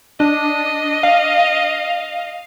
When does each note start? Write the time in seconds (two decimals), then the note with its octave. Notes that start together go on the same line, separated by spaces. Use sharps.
0.20 D4 D#5
1.03 F5